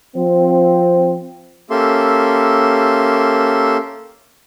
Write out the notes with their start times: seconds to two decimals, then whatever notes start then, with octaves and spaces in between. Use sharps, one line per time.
0.15 F3 C4
1.70 A#3 C#4 G4 A4 E5 C6